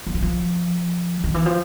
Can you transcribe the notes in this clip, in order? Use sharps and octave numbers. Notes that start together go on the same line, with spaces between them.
F3
F#3
F3
D#3
E3
F3